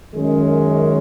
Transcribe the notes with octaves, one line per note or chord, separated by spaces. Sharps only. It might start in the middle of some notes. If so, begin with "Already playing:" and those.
F#2 D#3 G#3 C#4